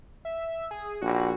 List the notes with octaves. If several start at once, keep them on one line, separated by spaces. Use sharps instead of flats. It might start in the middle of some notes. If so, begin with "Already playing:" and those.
E5
G#4
A#1 F#4